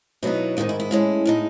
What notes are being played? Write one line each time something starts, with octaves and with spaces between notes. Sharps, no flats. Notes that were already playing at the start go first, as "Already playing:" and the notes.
B2 F#3 B3 D#4 E4
G#2 D#3 G#3 D#4
E4
E4
A2 G#3 C#4
A2 G#3 D#4